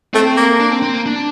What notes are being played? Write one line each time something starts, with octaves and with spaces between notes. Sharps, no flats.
A3 C4
A#3
D4
C4
C4
A#3
D4